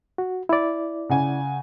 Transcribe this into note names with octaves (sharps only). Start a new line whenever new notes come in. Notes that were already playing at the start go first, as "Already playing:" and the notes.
F#4
E4 D5
C#3 F#5 G#5